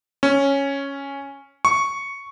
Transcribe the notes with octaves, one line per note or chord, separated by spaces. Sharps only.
C#4
C#6